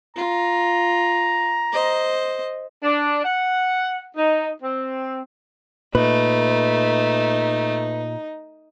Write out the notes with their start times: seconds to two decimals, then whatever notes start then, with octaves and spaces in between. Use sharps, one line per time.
0.17 F4 A#5
1.73 C5 D#5
2.83 D4
3.24 F#5
4.16 D#4
4.62 C4
5.95 A#2 A3 D#4 B4